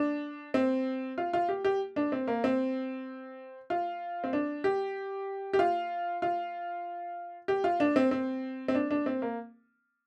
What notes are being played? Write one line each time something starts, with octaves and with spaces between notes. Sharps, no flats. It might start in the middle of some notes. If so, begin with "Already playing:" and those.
Already playing: D4
C4
F4
F4
G4
G4
D4
C4
A#3
C4
F4
C4
D4
G4
G4
F4
F4
G4
F4
D4
C4
C4
C4
D4
D4
C4
A#3